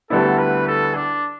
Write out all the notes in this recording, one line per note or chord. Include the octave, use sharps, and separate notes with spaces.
D2 D3 G3 B3 E4 A4
B4
A4
D4